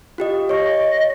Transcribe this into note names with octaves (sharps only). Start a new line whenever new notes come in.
F4 G4 D#5
C#5 D#5 C#6